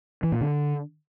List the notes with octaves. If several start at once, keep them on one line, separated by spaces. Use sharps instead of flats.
E3
A#2
D3